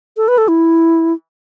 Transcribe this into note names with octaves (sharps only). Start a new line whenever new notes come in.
A4
B4
A4
E4